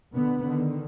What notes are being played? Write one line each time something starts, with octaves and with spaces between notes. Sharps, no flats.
B2 D3 B3
D3 D#3